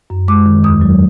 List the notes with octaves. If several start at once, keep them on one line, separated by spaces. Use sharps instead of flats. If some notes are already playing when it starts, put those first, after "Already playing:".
F#2
G#3 D6
D#3
E2 D#6
F#3